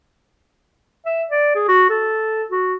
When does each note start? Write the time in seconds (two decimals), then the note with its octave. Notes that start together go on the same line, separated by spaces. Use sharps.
1.05 E5
1.29 D5
1.55 G#4
1.68 F#4
1.90 A4
2.51 F#4